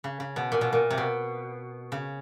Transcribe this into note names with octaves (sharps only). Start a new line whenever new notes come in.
C#3
C#3
B2
A#2
B2
A#2
C3
B2
C#3